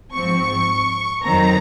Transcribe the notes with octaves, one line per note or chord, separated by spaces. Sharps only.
G#2 F3 C4 C#6
F2 D#3 F#3 C4 A#5